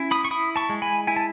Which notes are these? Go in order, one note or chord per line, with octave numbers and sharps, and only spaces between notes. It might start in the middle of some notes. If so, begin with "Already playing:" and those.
Already playing: C#4 E4
B5 D#6
C#6
E4 B5 D#6
A5 C#6
G#3
G#5 B5
E4 G#5
A5